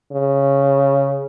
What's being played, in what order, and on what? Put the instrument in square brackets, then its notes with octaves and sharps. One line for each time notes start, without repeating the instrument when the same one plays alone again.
[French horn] C#3